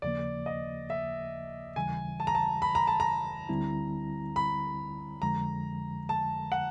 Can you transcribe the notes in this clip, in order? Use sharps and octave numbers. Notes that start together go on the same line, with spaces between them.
D#2 C#3 F3 A#3 D5
D#5
E5
D#2 C#3 E3 G3 G#5
A5
A#5
A5
B5
A#5
A5
A#5
D2 D3 G3 C4 E4
B5
F2 D3 F3 G#3 A#5
A5
F#5